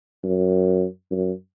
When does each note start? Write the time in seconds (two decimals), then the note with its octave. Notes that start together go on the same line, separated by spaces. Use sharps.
0.24 F#2
1.11 F#2